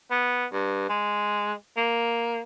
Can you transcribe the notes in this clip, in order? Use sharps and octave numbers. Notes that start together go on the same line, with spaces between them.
B3
G2
G#3
A#3